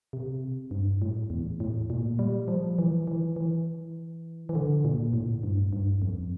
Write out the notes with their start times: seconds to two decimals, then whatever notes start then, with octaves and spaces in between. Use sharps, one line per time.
0.13 C3
0.71 G2
1.02 A2
1.30 E2
1.60 A2
1.90 A#2
2.19 G3
2.48 F3
2.78 E3
3.07 E3
3.36 E3
4.49 E3
4.55 D3
4.85 A#2
5.13 A2
5.43 G2
5.73 G2
6.02 F2